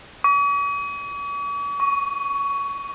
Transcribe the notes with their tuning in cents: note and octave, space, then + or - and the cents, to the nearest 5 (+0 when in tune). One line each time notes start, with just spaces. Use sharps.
C#6 +45
C#6 +15